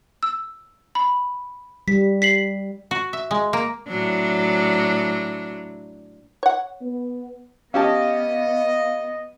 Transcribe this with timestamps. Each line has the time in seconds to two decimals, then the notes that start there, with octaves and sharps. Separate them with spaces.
0.23 E6
0.95 B5
1.88 G3 B6
2.22 B6 C7 F#7
2.91 F#4
3.13 E5
3.31 G#3
3.53 A#3
3.87 A2 F#3 D4
6.43 C#5 F#5
6.82 B3
7.74 B3 C#4 G4 D#5 F5 A5